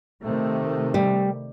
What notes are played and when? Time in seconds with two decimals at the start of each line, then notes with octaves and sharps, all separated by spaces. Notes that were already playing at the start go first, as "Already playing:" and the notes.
0.23 C3 D#3 A3
0.94 G3